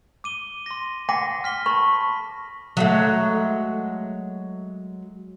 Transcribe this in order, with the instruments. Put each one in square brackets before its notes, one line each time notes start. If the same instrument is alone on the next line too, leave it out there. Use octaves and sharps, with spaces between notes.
[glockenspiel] D6 D#7 G7
C6 A#6
[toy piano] F#5 G5 D6 [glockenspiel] A#6
[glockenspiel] F6 B6 G7
[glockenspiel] A5 B5 [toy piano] C#6
[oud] F#3 G#3 A3